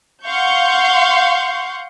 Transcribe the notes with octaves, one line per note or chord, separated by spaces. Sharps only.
F5 F#5 C6 C#6 G6